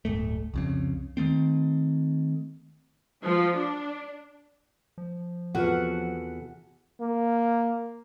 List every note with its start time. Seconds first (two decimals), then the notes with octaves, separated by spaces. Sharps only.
0.05 D1 G1 A3
0.54 C2 F2 C#3
1.17 D#3 F#3 A3 C4
3.23 F3
3.56 D4
4.98 F3
5.55 E2 C3 F4 F#4 A4 B4 F#5
7.00 A#3